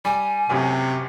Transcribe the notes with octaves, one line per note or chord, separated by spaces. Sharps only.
G3 G#5
C#2 F#2 A2 C3